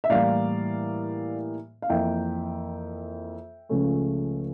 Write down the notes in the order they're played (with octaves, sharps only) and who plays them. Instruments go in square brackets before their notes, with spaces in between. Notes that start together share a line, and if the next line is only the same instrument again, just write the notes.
[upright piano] E5
A2 E3 G3 A#3 D5 F5
F5
F2 E3 A#3 E5 G5
C#2 C#3 F3 A3 C#4